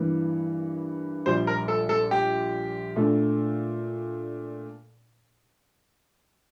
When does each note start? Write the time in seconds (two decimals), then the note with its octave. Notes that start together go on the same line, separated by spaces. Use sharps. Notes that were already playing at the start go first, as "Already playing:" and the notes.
Already playing: G2 E3 A#3
1.26 A#1 A#2 G3 C5
1.47 A#4
1.68 A4
1.89 A4
2.11 G4
2.96 A#2 A3 D4 A4